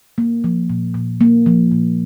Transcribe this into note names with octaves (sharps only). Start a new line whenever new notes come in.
A#3
F3
A#2
A#2
A#3
F3
A#2